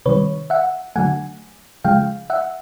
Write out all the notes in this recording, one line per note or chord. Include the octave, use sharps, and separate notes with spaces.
C3 D#3 G3 B4 C#5
E5 F#5
D3 F#3 A3 F#5 G#5
C#3 F3 G#3 F5 G5
E5 F#5